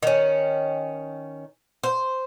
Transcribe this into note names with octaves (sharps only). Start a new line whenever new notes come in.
D#3 C#4
C5